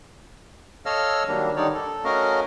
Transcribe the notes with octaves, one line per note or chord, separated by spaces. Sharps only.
A4 C#5 D#5 F5 E6 F6
D#3 F#3 G3 A#3 D4
D3 D#3 G3 D#4 C#5 D5
A4
A3 C#4 F#4 A#4 D#5 F5